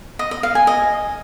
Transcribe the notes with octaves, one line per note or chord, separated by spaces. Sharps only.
D#5
D#5
F5
G#5
D#5